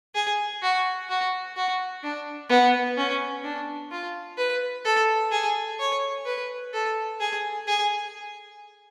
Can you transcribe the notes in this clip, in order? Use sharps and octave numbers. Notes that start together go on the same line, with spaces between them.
G#4
F#4
F#4
F#4
D4
B3
C#4
D4
F4
B4
A4
G#4
C#5
B4
A4
G#4
G#4